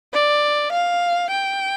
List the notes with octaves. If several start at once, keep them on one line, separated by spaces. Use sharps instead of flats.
D5
F5
G5